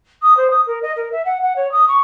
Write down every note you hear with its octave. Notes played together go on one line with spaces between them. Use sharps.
D#6
C5
D#6
A#4
D#5
A#4
E5
F#5
F#5
C#5
D#6
C#6